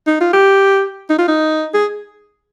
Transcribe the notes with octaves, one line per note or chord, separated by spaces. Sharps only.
D#4
F4
G4
D#4
F4
D#4
G#4